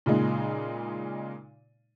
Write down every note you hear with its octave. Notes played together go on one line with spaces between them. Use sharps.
A#2 C#3 G#3 D#4